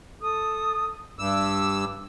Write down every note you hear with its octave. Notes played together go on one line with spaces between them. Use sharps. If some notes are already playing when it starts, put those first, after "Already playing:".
A4 D#6
G2 D6 E6